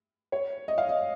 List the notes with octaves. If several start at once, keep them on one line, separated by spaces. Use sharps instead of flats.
C#5
D#5
F5
D#5